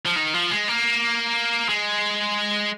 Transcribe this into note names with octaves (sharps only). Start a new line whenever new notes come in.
F3
D#3
F3
G#3
A#3
G#3